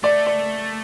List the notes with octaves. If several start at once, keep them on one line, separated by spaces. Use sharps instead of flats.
A3 D5
D5